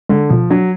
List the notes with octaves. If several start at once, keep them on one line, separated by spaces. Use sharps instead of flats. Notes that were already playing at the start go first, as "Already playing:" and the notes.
D3 G#3
B2 F3
F#3 D4